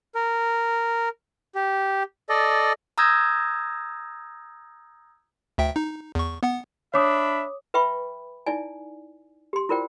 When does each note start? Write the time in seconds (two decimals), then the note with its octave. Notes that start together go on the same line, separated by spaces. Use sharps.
0.15 A#4
1.55 G4
2.29 A4 D5 D#5
2.98 A#5 D#6 E6 G6 G#6 A#6
5.58 D2 E5 G5
5.76 D#4
6.15 E2 C#6
6.43 B3 F#5
6.94 D4 C#5 E5 B5 D6 D#6
7.74 B4 E5 G5 B5 C#6
8.46 D#4 E4 D5 G#5
9.53 G4 C6
9.69 E4 F4 A#4 C5 D5 G5